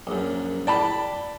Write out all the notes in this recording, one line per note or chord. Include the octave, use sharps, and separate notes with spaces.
A#1 F#2
D5 G5 A5 B5